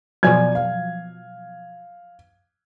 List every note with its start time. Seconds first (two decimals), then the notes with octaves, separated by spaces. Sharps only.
0.23 B2 F3 F#3 D5 G#5 G#6
0.55 F5